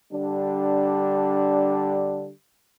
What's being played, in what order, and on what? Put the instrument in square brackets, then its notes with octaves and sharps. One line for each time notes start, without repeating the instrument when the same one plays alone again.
[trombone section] D3 G3 D4